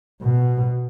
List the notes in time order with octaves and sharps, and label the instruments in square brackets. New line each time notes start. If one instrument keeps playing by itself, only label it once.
[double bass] B2